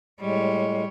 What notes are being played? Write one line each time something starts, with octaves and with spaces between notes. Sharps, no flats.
A2 G3 G#3 C#5